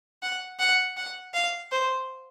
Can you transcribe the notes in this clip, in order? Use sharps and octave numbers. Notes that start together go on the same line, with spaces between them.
F#5
F#5
F#5
F5
C5